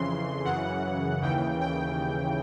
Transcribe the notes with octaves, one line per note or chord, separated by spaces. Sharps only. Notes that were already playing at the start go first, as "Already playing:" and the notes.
Already playing: F2 C#3 E3 C6
F#2 C#3 E3 F#5
D#2 C#3 E3 G5
G5